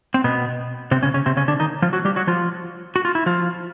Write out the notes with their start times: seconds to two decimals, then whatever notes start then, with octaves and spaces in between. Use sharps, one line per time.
0.14 C4
0.24 B2 B3
0.91 C3 C4
1.03 C#3 C#4
1.14 C#3 C#4
1.26 C3 C4
1.37 C#3 C#4
1.48 D3 D4
1.60 D#3 D#4
1.82 F3 F4
1.93 F#3 F#4
2.05 G3 G4
2.16 F#3 F#4
2.27 F3 F4
2.96 F#4
3.05 F4
3.15 E4
3.26 F3 F4